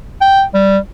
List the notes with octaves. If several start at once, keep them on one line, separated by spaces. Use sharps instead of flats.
G5
G3